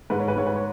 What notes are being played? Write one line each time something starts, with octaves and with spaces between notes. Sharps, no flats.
G#2 B4
C#5
B4
G#2 C#5
B4
C#5